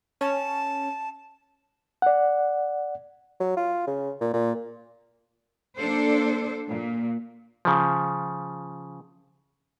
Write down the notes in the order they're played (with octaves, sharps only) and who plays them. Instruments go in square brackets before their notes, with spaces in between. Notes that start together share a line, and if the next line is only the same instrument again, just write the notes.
[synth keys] C#4 [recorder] A5
[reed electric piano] D5 F#5
[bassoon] F#3
F4
C#3
A#2
A#2
[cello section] A#3 D4 A4 C5
A#2
[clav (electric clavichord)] C#3 F3